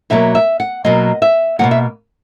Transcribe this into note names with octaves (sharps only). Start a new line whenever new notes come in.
B2 F#3 A#3 E5
E5
F#5
B2 F#3 A#3 D#5
E5
B2 F#3 A#3 F#5
E5